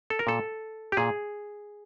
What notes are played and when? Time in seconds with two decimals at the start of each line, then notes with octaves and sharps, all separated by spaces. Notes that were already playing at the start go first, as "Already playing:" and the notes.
0.10 A4
0.19 A#4
0.27 A#2 A4
0.92 G4
0.97 A#2 G#4